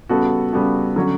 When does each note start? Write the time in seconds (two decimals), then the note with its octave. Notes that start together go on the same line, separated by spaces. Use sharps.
0.09 C#3 G3 B3 F#4 A4
0.53 C#3 G3 B3 F#4 A4
0.96 D3 F#3 C#4 F#4